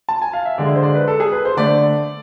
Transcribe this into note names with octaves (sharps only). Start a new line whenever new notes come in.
A5
G#5
F5
E5
D3 G#3 D5
C5
D5
B4
A4
G#4
B4
C5
D3 A3 D5